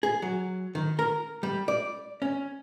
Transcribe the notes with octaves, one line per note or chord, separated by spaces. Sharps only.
G#4
F#3
D#3
A#4
G3
D5
C#4